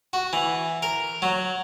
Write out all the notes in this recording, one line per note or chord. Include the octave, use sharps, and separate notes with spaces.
F#4
E3
A#4
F#3